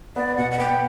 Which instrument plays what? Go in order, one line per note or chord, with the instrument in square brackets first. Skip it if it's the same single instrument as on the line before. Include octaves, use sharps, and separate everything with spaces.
[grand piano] B3 [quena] D5
[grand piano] B2 [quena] F#5
[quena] F#5
[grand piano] B3 [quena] G5